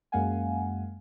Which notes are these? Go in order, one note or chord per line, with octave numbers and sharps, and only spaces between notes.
F#2 G#3 A#3 F5 F#5 G#5